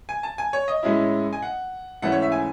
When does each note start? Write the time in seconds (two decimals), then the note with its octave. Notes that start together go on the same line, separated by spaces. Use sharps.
0.09 G#5
0.23 A5
0.38 G#5
0.53 C#5
0.68 D#5
0.83 A2 G#3 C#4 E4
1.33 G#5
1.42 F#5
2.02 G#2 E3 A3 C#4 E4 F#5
2.12 C#5
2.22 E5
2.32 G#5